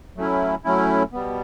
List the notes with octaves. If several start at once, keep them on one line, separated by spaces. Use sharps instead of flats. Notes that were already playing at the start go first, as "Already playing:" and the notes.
F#3 A3 C#4 E4
F#3 A3 C#4 E4
B2 G3 B3